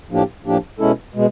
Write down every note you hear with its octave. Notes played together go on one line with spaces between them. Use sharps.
A2 F3 A#3 D4 G4
A2 F3 A#3 D4 G4
B2 G#3 C#4 E4 A4
B2 G#3